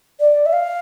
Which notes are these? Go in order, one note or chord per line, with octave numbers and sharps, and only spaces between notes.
D5
E5
F5